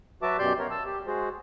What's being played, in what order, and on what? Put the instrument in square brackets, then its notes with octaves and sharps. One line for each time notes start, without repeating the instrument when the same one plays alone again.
[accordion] F#3 F#4 B4 E5 A5 D6
F#2 B2 G4 D5 C6 G6
B3 A#4 C#5
A5 E6
G4
G#3 F#4 G#4 C5